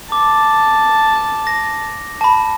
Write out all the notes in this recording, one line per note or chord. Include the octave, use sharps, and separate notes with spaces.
A5 D6
A#6
A5 B5